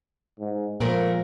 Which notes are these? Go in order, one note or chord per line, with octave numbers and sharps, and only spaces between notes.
G#2
A#2 F3 G#3 A3 A#4